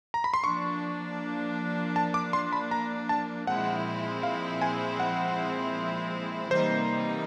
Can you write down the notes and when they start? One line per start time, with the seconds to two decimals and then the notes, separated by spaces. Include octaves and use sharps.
0.14 A#5
0.24 B5
0.34 C6
0.43 F3 A#3 D4 C#6
1.96 A5
2.14 D6
2.33 C6
2.53 B5
2.71 A#5
3.09 A5
3.47 A#2 F3 G#3 C4 E4 F#5
4.23 F5
4.61 G#5
5.00 F#5
6.51 C3 E3 G3 A#3 D#4 C5